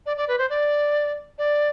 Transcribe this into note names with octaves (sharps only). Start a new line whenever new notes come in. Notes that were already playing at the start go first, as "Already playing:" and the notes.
D5
D5
B4
C5
D5
D5